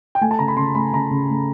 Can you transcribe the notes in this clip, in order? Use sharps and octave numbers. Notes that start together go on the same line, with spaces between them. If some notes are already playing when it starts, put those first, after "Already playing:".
G5
A3 G#5
A5
C#3 A#5
B5
C#3 C6
A3 B5
C#3 A#5
C#3
A3